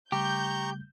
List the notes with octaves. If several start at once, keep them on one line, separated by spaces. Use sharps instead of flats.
C#3 G3 A3 G4 A#5 C#6 G6